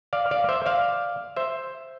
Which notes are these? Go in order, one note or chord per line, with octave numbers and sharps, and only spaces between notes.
D5 F5
D5 F5
C5 E5
D5 F5
C5 E5